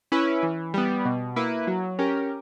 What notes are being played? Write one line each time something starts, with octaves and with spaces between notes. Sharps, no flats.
C#4 E4 B4
E3
G3 B3
B2
A#3 E4 B4
F#3
C#4 G4 A#4